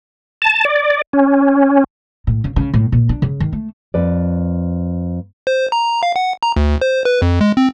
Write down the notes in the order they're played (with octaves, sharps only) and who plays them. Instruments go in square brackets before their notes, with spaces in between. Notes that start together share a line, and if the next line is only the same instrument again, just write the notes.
[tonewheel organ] A5
D5
C#4
[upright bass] A2
C#3
C#3
A2
A#2
D4
C#3
D#3
A3
[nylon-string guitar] F2 B4 D5
[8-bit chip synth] C5
A#5
F5
F#5
A#5
D2
C5
B4
F2
G#3
C4